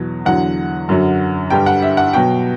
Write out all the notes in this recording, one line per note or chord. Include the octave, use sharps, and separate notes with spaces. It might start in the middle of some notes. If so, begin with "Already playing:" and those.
Already playing: E2 B2 F#3
E2 D3 F#3 F#5
F#2 D3 F#3
G2 D3 G3 G5
F#5
E5
F#5
B2 F#3 G5